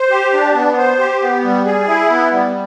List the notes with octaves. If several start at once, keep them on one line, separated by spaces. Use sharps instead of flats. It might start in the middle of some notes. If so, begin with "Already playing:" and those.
Already playing: C5
G4
D4
B3
C5
G4
B3
G3
G#4
E4
B3
G3